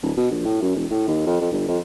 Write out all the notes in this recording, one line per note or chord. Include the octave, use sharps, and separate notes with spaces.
D1
B2
A#1
A2
F#2
E1
A2
D#2
F2
F2
G1
F2